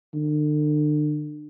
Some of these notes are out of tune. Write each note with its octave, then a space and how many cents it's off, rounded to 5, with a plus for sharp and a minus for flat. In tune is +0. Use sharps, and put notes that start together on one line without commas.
D3 +40